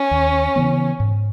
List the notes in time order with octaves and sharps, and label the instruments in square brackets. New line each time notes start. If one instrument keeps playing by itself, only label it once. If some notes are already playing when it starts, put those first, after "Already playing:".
Already playing: [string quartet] C#4
[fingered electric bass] D#2
C#3 E3 B3
G#2